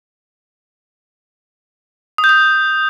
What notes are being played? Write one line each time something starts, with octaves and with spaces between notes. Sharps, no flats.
D#6
G6
D#6